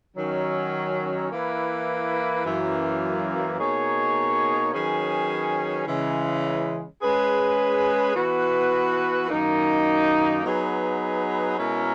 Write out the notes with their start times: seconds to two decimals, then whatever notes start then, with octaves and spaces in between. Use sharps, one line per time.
0.16 D#3 F#3 C#4
1.31 E3 A#3 E4 B4
2.45 F#2 E3 A#3
3.59 B2 A#3 D#4 G#4 C#5
4.73 D#3 F#3 C#4 G#4 B4
5.87 C#3 E3 G#3
7.02 G#3 C#4 G#4 B4
8.15 E3 B3 F#4 B4
9.29 F#2 D#3 A#3 D#4
10.44 F#3 B3 D#4 G#4 B4
11.58 B2 G#3 C#4 E4 A#4